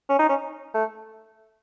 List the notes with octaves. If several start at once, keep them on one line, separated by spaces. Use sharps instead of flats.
C#4
D#4
C#4
A3